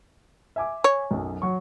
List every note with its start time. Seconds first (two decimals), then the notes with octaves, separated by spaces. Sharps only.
0.56 E5 G#5 D6
0.84 C#5
1.11 B1 F#2
1.42 F#3 C#6